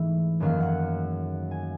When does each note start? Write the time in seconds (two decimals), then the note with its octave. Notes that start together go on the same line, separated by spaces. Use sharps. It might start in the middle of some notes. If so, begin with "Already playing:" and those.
Already playing: G#2 E3 A3 E5
0.40 F#2 D#3 F#3 A#3 F5
0.60 F#5
1.51 G#5